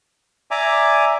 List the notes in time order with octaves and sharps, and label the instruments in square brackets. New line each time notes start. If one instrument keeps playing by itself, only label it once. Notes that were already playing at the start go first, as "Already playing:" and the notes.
[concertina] D5 E5 G#5 A#5 D6